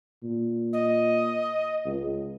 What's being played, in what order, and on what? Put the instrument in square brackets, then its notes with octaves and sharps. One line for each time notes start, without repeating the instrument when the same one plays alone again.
[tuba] A#2
[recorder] D#5
[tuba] C#2